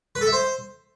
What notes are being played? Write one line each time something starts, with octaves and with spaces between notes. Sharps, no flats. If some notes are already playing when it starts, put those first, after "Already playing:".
B4
A4
E5
C5